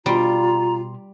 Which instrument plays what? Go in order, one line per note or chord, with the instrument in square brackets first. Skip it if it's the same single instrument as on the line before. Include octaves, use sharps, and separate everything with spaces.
[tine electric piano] B2 C6 [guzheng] G3 [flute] F4 [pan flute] A#5